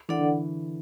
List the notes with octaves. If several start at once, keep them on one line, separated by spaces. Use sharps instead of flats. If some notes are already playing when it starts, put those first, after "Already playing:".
E3 D4 A4 D5 F#5
D3